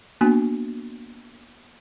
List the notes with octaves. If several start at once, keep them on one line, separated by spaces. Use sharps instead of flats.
A#3 B3 D4 F#4 G#5